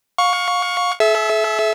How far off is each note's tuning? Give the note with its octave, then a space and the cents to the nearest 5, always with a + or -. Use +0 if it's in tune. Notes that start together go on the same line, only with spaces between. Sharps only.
F5 +30 C#6 +5
A4 -45 E5 +0